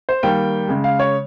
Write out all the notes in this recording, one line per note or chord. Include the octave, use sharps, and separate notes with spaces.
C5
D#3 G3 A#3 G5
C#3 G#3
F5
C#5